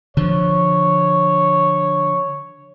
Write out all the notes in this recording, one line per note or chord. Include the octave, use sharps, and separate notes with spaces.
D3 F3 C#5